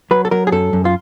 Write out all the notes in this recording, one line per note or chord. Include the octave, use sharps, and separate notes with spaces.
F#3 B4
A4
F#3 A#4
G#4
F#2 A4
F#2
F4